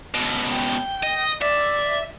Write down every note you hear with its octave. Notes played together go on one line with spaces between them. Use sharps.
C#2 B2
G5
D#5
D5 E5